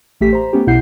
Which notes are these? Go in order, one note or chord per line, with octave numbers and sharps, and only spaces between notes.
A1 A3 G4 B6
C5 A#5
A3 B3 C#4 G4
B1 B2 E4 F#5 G6 C7